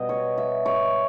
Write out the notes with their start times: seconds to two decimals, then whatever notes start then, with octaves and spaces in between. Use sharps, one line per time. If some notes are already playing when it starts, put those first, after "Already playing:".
Already playing: B2 G3 B3 D#5
0.09 C#5
0.38 E5
0.66 C#5